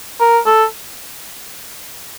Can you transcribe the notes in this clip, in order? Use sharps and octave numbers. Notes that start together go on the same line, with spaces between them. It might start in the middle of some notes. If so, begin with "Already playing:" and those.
A#4
A4